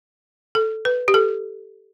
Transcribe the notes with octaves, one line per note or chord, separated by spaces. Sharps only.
A4
B4
G4
A4